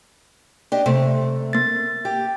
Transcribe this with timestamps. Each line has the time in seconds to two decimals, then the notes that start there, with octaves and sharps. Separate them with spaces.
0.72 D4 G4 D#5
0.86 C3 A3
1.53 A#3 A6
2.05 G4